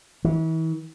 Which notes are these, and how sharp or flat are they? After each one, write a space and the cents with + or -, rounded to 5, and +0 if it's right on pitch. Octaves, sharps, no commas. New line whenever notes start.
E3 -40